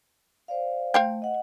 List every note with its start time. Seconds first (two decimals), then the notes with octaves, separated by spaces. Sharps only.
0.48 C5 D5 F5
0.94 A3 C5 F5 G5
1.22 D#5 F#5